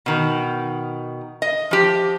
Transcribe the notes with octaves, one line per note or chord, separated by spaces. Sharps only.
B2 D#3
D#5
F3 G4